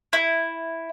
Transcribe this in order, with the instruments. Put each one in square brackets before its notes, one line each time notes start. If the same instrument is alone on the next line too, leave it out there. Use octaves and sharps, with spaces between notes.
[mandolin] E4